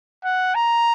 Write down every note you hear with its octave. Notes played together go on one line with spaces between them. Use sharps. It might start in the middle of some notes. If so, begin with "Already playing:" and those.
F#5
A#5